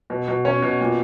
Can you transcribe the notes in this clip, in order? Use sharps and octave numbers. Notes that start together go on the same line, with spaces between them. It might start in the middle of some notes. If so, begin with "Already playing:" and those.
B2
B2
B2 C#4 C#5
B2
A#2